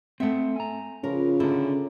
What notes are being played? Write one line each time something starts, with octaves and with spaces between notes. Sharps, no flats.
A3 C4 E5 F#5
G#5 A#5
C#3 F3 A#4 B4 D6
D3 C#4 E4 E5 F#5 A#5